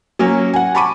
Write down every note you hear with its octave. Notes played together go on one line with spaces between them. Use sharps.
F#3 A#3 C#4
F#5 G#5
A5 B5 C#6 D6 D#7